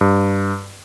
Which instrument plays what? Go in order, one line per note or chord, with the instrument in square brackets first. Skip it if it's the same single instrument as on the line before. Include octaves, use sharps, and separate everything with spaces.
[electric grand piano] G2